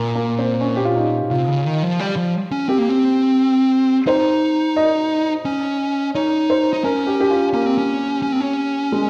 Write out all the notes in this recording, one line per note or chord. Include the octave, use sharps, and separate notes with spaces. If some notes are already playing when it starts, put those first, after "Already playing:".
Already playing: A#2 A#3
A#3
C4
C#4
G4
F4
D#4
C3 F4
C#3
D#3
F3
G3
F3
C#4
C4 G4
A#3
C4
D#4 C5
D#5
C#4
D#4 C#5
C5
D#4
C#4 A#4
G4
G4
F4
A#3 C#4
C4
C#4
C#4
C4
C#4
G#3